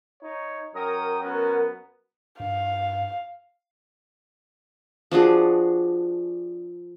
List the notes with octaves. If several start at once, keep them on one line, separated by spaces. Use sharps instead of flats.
D#4 C#5
F#2 A#4 C#5 G5 D#6
B3 C#4 F#4
G2 F5
F3 D4 F#4 G#4